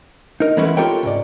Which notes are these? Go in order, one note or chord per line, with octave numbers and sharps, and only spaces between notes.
D#4 A#4
E3 G#3 A3 B3 C#4 E4
F4 G4 A4 A#4 C#5 G5
C#2 G#2 D5